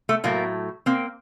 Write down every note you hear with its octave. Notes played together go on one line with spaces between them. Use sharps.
A3
A2 F#3 A3 A#3
A#3 C4